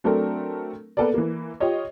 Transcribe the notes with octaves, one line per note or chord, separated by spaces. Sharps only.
F#3 A3 C4 D4 A4 A#4
A#3 B3 A4 A#4 D5
E3 A#3
F4 G4 C#5 D#5